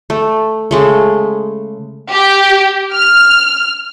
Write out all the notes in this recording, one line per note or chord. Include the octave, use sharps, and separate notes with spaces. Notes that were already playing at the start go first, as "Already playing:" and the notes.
A3
C#3 G#3 A3
G4
F6